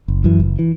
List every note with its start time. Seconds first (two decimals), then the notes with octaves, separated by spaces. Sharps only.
0.08 F#1
0.24 F#2 E3
0.40 F#1
0.59 E3